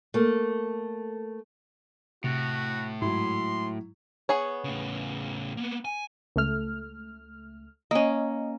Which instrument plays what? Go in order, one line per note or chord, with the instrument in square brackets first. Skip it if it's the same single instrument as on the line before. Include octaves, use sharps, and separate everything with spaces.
[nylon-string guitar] A3 A#3
[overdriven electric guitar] A2 [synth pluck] C3 [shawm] F#4
[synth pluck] G#2 [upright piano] F#3 E4 [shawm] C6
[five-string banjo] B3 G#4 C#5
[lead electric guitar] A2 C#3
A#3 B3
G#5
[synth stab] C#2 A3 F6
[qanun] A#3 C#4 [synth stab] D#5